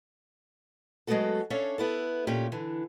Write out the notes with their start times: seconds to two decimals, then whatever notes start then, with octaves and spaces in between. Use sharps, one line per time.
1.07 F#3 G#3 A3 B3 F#4 A4
1.50 C#4 D4 A4 C#5 E5 F5
1.78 B3 E4 A4
2.27 A#2 C#4 G4
2.52 D3 E3